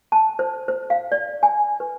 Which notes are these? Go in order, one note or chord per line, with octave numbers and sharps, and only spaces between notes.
A5
C5
C5
F5
D5
G#5
B4